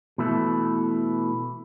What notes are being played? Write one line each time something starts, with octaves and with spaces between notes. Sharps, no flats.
B2 E3 A3 E4